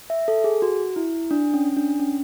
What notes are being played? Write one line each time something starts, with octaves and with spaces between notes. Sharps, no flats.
E5
A4
G#4
F#4
E4
D4
C#4
D4
C#4